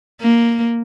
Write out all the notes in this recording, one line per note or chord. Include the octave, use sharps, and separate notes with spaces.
A#3